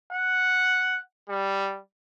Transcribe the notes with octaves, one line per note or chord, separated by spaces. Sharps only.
F#5
G3